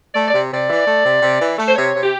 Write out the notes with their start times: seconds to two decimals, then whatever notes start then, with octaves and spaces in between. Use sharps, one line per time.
0.14 A3 D5
0.28 C3 D5
0.51 C3 D5
0.69 E3
0.86 A3
1.04 C3
1.21 C3
1.40 E3
1.58 A3
1.68 C5
1.76 C3 C#5
1.94 C3
2.03 G4